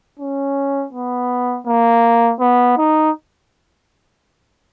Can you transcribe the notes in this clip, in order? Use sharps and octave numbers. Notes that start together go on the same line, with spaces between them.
C#4
B3
A#3
B3
D#4